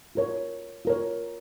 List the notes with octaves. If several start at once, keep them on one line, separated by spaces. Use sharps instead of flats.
F4 A#4 C#5
F4 A#4 C#5